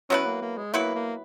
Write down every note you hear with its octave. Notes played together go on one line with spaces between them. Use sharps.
F#3 B3 C#4 E4 B4
A#3
A#3
G#3
F#3 A#3 B3 E4 B4
A#3